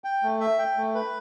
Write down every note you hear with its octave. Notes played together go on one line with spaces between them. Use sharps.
G5
A3
E5
G5
A3
B4